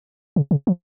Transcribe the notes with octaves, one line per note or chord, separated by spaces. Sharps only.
C#3
C#3
F3